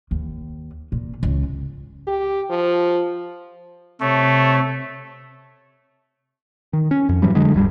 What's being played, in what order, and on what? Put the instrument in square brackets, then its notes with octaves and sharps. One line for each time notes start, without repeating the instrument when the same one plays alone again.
[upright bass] D#2
A#2
C#2
[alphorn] G4
F3
[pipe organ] C3 C#5 [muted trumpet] A3
[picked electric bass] D#3
C#4
F2
G#2 E3 F#3 G3
D3 F#3 G#3
D1 G2 G3